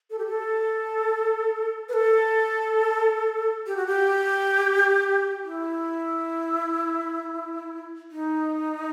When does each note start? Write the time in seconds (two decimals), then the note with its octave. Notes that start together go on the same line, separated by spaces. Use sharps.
0.10 A4
0.19 G4
0.27 A4
1.89 B4
1.93 A4
3.67 G4
3.77 F#4
3.87 G4
5.44 E4
8.11 D#4